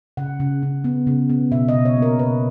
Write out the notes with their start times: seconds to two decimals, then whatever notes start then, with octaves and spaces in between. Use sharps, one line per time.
0.17 C#3 F#5
0.40 C#3
0.62 C#3
0.84 B3
1.07 C#3
1.29 B3
1.52 B2 E5
1.68 D#5
1.74 B2
1.85 C#5
1.97 A#3
2.02 A#4
2.19 B2 B4